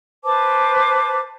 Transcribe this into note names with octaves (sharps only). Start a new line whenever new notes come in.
B4 C5 A5 D6